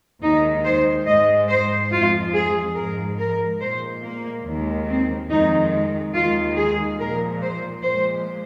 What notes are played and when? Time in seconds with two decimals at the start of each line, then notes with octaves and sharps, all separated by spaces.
0.22 D#2 D#3 G#3 D#4
0.64 C5
1.07 G#2 G#3 D#5
1.49 C5
1.91 F2 F3 G#3 F4
2.34 G#4
2.76 G#2 F3 G#3 A#4
3.18 A#4
3.60 A#2 G#3 C5
4.03 A#3
4.45 D#2 D#3 G#3
4.88 C4
5.30 F2 D#3 G#3 D#4
6.14 D#2 D#3 G#3 F4
6.57 G#4
6.99 A#2 F3 G#3 A#4
7.42 C5
7.84 A#2 F3 G#3 C5